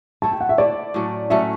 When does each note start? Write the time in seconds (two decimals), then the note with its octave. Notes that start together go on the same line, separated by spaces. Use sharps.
0.22 D3 A3 E4 A5
0.32 G5
0.41 F#5
0.49 E5
0.58 D3 A3 E4 D5
0.94 A2 F#3 A3 C#4
1.30 A2 F#3 A3 C#4 E5